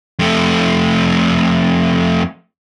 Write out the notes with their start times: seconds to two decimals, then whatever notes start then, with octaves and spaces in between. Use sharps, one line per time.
0.19 F2 A3